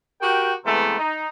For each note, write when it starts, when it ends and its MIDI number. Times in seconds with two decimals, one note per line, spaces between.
0.21 0.53 66
0.21 0.53 67
0.21 0.53 70
0.21 0.53 79
0.65 0.95 48
0.65 0.95 52
0.65 0.95 56
0.65 0.95 57
0.65 0.95 59
0.98 1.27 63